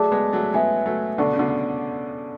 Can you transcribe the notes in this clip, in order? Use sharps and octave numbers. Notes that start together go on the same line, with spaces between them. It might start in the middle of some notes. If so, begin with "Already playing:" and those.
Already playing: F#3 A3 G#4 D5 A5 D6
G#3 B3
F#3 A3
G#3 B3 B4 E5 G#5
F#3 A3
B2 D3 A4 D5 A5 C#6
C#3
B2 D3